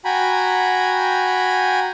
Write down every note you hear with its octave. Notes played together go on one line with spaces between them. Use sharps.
F#4 G5 G#5 A#5 B5